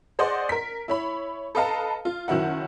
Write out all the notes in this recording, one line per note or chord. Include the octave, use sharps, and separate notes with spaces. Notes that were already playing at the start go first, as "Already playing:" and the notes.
G#4 C5 D5 D#5 F#5 C6
A#4 B6
E4 C#5 B5
A4 B4 D#5 F5 A5 A#5
F4
F#1 D#3 F#3 E4 F#5